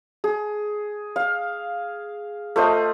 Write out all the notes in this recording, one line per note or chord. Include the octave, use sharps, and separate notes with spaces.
G#4
F5
A3 F4 C5 D#5